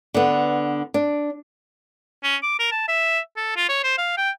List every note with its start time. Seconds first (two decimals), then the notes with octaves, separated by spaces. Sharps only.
0.14 D3 B3
0.94 D4
2.24 C#4
2.43 D6
2.59 A#4
2.72 A5
2.88 E5
3.37 A4
3.56 F4
3.69 C#5
3.84 C5
3.98 F5
4.18 G5